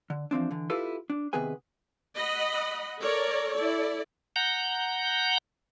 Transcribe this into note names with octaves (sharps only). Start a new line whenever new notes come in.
D3
E3 F3 C4 D4
D3 E3
E4 F4 G4 A4 B4
D4
C3 D#3 B3 G#4 B4 G#5
D#5 F#5 B5
A4 A#4 C#5 D5
E4 A4 D5
F#5 A#5 G6